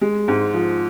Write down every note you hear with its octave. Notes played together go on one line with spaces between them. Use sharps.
G#3
G#2
F3